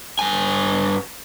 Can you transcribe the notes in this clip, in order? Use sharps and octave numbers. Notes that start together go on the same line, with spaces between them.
G2 G#5